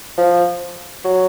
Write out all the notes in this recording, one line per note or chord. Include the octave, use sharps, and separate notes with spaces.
F3
F#3